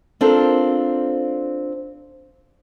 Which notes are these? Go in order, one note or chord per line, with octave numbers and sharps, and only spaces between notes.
C4 D4 F4 A4 A#4 C5